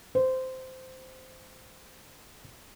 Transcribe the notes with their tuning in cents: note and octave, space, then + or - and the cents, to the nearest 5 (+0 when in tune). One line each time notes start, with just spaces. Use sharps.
C5 -15